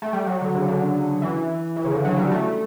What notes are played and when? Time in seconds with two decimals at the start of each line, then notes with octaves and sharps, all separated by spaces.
0.02 A3
0.13 G3
0.27 F#3
0.41 D3
0.54 C#3
0.68 D3
1.22 E3
1.76 E3
1.84 C#3
1.90 D3
2.05 F#3
2.17 G3
2.32 A3